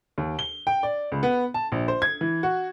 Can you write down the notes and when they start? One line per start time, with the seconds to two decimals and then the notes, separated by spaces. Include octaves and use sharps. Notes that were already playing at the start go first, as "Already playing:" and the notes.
0.18 D#2
0.39 G7
0.67 G5
0.83 D5
1.12 C#2
1.23 B3
1.54 A5
1.72 A#1
1.88 C5
2.02 G#6
2.21 E3
2.43 F#4